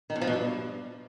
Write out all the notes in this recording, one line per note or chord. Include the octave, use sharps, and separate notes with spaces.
D#3
E2
F3
B2
G2